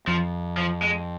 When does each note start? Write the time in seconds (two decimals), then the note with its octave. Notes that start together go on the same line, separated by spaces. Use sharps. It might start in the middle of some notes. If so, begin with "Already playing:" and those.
0.07 F2 F3
0.57 F3
0.82 G#3